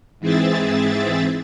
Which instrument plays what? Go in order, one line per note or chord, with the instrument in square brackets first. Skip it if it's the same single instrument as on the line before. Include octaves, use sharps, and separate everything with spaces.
[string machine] G#2 E3 C4 G#4 E5 A6